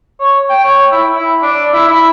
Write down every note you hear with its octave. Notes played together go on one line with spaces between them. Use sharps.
C#5
G5
C#5
E4
E4
D4
E4
E4